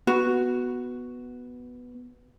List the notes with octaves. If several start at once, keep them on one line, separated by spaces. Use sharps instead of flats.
B3 F#4